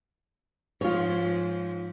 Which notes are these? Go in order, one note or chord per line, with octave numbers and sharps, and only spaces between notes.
G#2 F3 F4 C#5